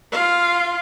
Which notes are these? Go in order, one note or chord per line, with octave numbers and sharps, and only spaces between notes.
F4 F5